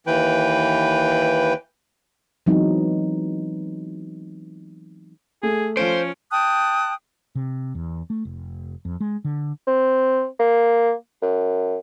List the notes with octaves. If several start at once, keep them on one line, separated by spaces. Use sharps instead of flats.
D#2 E3 B4 G5
E3 F#3 G#3 B3 C4 D#4
A3 G#4
F3 C#4 F4 C5 D7
G5 A5 D#6 F#6
C3
E2
A3
F1
F2
G#3
D3
C4
A#3
F#2